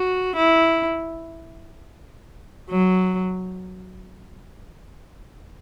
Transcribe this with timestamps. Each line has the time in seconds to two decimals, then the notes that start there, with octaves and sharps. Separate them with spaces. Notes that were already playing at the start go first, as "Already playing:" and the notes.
Already playing: F#4
0.36 E4
2.70 F#3